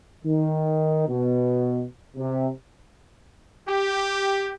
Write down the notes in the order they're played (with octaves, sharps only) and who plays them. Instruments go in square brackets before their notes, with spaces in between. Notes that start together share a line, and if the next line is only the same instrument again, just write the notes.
[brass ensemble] D#3
B2
C3
[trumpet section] G4